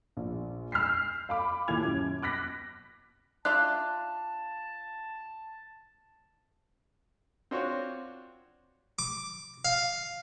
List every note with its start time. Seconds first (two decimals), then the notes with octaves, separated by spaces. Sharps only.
0.17 A#1
0.72 E6 F6 G6 B6 C7
1.29 F5 B5 D6
1.68 D#2 A#2 E4 D6 G#6 F7
1.85 F#2
2.22 D6 F#6 A#6 B6
3.45 D4 F4 D5 E5 F5 A5 C6 F#6
7.51 C4 D4 F4 F#4 C#5
8.99 D6
9.65 F5